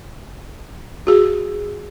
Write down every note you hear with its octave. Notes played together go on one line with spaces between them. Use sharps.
F#4 G#4